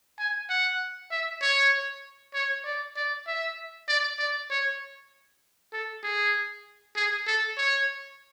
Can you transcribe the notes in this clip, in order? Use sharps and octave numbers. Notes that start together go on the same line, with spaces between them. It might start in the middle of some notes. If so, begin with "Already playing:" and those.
G#5
F#5
E5
C#5
C#5
D5
D5
E5
D5
D5
C#5
A4
G#4
G#4
A4
C#5